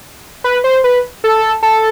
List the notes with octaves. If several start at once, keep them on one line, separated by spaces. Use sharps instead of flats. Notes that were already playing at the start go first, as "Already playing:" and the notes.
B4
C5
B4
A4
A4